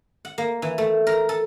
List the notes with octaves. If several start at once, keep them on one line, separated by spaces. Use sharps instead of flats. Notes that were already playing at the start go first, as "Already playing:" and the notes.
F#5
A#3
E3
A3
A#4
A4